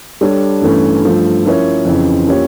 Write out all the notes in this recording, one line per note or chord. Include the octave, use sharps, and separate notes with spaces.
G3 D4 A4 C#5
G2 E3 A3 C#4
G2 F3 A3
F3 C#4 E4 A#4 C#5
F2 C#3 E3
F3 A#3 C#4 G4 C#5